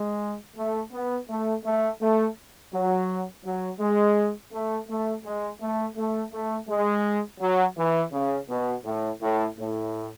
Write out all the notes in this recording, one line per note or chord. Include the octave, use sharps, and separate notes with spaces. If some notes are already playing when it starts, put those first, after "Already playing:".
Already playing: G#3
A3
B3
A3
A3
A3
F#3
F#3
G#3
A3
A3
G#3
A3
A3
A3
G#3
F#3
E3
C#3
B2
A2
A2
A2